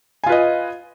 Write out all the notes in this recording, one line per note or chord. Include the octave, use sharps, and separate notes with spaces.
F4 B4 D#5 G#5